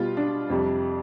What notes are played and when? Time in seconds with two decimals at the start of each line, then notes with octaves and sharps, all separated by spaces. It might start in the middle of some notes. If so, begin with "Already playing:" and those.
Already playing: B2 G3 F4
0.17 D4
0.50 F2 C3 G3